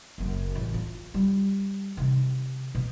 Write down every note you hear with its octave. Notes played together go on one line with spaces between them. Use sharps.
F#1 F#2
A1
F4
G3
C3 D#3
B2